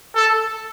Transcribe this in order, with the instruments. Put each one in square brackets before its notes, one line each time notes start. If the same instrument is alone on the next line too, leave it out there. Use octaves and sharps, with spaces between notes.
[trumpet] A4